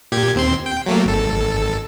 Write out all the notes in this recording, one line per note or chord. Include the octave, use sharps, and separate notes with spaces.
A#2 G4 G#6
D#2 C4 C6
G5
F#3 A3 A#3
G#1 A4